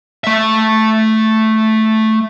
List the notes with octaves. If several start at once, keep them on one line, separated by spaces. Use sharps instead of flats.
A3 E5